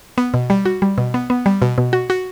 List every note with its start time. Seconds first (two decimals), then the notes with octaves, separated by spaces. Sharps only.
0.18 B3
0.34 B2
0.50 G3
0.65 F#4
0.82 G3
0.98 B2
1.14 B3
1.30 B3
1.46 G3
1.62 B2
1.78 B2
1.93 F#4
2.10 F#4